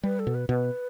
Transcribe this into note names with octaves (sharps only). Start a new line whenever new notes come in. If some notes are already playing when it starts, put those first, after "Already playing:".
G3 B4
A4
B2
B4
B2 B4